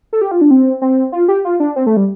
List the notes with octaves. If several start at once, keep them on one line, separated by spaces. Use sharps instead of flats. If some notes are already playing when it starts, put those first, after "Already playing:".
A4
G4
F4
D4
C4
C4
F4
G4
F4
D4
C4
A3
G3